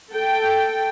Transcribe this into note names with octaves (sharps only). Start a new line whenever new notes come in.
A4 G5